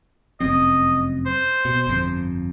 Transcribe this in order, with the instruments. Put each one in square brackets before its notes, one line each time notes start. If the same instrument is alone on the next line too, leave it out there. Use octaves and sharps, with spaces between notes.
[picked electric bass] F1 F#2 C4 [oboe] D#5
[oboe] C5
[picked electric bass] B2
G1 F2